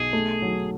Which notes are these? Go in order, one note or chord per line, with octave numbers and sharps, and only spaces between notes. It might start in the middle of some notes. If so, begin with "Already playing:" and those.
Already playing: B1 G#4
A3
F#3